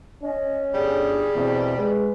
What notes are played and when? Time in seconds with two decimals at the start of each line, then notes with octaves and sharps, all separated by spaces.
0.23 C#4 D#5
0.74 G1 G3 G#4
1.35 E2 B2 C4
1.78 G#3 G#4 B4